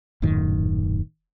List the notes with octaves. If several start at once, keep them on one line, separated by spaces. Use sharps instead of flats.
D#1 F#2 A2 D#3